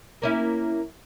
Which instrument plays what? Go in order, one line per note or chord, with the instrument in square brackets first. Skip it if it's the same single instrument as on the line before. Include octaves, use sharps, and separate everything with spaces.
[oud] A#3 C#4 E4